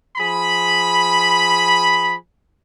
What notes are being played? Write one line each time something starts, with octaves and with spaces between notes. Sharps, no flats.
F3 G#4 B5